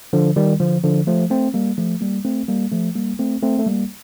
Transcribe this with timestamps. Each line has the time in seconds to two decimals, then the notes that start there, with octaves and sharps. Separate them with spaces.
0.13 D3 F3
0.36 D#3 G3
0.60 D3 F3
0.83 D3 F3
1.07 F3 A3
1.30 A3 C4
1.54 G3 A#3
1.78 F3 A3
2.01 G3 A#3
2.25 A3 C4
2.49 G3 A#3
2.72 F3 A3
2.95 G3 A#3
3.19 A3 C4
3.43 A3 C4
3.59 A3
3.66 G3 A#3